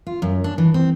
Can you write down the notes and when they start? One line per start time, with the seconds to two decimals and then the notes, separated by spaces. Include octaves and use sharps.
0.07 F4
0.22 F#2
0.44 D4
0.58 E3
0.74 C4